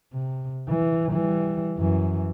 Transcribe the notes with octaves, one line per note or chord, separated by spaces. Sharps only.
C3
E3
E3 G3
F#2 E3